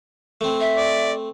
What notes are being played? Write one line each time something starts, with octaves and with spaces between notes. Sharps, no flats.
A3 C4
E5
D5